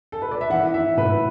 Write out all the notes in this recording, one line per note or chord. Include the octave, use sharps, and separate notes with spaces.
A4
B4
D5
E5
E3 F#5
E3 E5
A2 B4